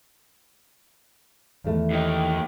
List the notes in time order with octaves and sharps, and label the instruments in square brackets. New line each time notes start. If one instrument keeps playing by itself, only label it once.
[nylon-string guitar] E2 D#3 A3
[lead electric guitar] D#2 D#4